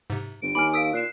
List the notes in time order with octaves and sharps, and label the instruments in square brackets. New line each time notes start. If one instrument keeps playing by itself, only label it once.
[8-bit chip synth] G#2 C3
[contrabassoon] G1 [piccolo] D7
[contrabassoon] D#2 [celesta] G#5 D6 [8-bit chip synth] B5 F6
[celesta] A#4 F5 [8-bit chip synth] D#6 E6 B6
[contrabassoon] A#2 [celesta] F#6 C7 E7